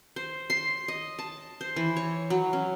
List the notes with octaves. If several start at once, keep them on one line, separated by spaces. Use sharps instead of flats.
C5
C6
D#5
A5
C5
E3
C#5
F#3
C#4